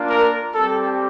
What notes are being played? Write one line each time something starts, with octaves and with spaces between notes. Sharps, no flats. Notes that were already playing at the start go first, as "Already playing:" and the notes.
Already playing: A#3 D4 F4
A#4
G3 C4 G4 A4